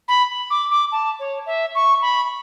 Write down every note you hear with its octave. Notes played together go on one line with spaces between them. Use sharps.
B5
D6
D6
A5
C#5
E5
C#6
B5